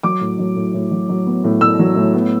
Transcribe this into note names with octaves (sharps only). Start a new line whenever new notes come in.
F#3 D6
A2
F#3
A2
A2
F#3
F#3
B3
A2
A2 E6
F#3
A2
B3